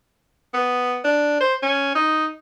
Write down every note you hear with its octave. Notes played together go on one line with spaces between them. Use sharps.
B3
D4
C5
C#4
D#4